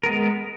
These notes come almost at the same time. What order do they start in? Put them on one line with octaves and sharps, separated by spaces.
A#4 B3 G#3